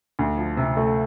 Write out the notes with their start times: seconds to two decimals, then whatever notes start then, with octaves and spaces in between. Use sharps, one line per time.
0.19 D2
0.38 F3
0.57 C3
0.77 A3